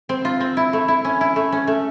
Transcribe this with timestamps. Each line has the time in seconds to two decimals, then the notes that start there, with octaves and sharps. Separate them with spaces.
0.09 C4
0.25 F4
0.41 C4
0.57 E4
0.73 A3
0.88 E4
1.05 C#4
1.21 E4
1.36 A3
1.52 C#4
1.67 A3